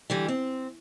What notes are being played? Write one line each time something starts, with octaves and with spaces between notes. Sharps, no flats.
D3 E3 G3
C4